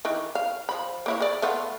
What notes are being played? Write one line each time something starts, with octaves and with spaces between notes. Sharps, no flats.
D#3 E3
F5
F3 B5
A#3 E4 C#5
G#4 D5
A3 B3 F4